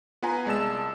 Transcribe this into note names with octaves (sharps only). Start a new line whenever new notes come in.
B3 F4 B4 F#5 G#5 A#5
C2 G#3 D5 A5 E6 E7